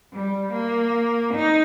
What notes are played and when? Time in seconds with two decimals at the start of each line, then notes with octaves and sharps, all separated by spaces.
0.13 G3
0.53 A#3
1.34 D#4